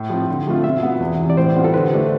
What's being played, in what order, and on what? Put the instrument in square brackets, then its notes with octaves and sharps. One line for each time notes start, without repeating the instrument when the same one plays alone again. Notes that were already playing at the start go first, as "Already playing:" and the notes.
Already playing: [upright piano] A2
F3 C4
D3
F3 A3 C4 F4
[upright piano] B2 [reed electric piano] E5
[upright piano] B3 F4
E2
C3 E3
[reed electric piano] D5
[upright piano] A2 [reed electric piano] C5
[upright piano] G3 B3 F4
[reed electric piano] A4
[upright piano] D3 [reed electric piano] B4
[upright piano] A3 D4 F4